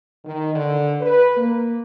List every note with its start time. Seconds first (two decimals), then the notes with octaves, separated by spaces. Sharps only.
0.25 D#3
0.55 D3
1.01 B4
1.37 A#3